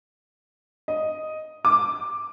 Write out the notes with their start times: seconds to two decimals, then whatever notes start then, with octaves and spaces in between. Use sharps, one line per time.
0.88 D#5
1.65 D6